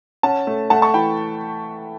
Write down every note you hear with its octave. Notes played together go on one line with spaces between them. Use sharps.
C#4 F#5 A5
A3
A3 F#5 A5
A5 C#6
E3 G5 B5